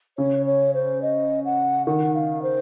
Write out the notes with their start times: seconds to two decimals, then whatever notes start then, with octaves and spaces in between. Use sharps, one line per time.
0.18 C#3 C#5
0.46 C#5
0.74 C5
1.02 D#5
1.45 F#5
1.87 D#3 F#5
2.15 F5
2.42 C5